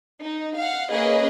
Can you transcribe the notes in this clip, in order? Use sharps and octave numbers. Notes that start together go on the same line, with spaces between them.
D#4
F5 F#5
A#3 C#4 G#4 B4 D#5